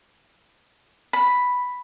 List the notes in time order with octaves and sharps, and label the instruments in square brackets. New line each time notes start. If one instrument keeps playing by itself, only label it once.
[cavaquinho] B5